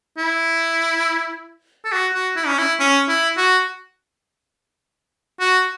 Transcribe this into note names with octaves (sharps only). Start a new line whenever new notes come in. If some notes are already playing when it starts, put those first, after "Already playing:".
E4
A4
F#4
F#4
E4
C#4
E4
C#4
E4
F#4
F#4